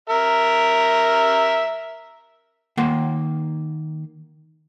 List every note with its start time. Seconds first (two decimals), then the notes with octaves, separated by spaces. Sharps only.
0.09 A#4 E5
2.77 D#3 A#3 F#5 C6